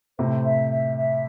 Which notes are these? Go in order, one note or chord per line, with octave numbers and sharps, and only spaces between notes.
A2 C3 C5
E5
E5
E5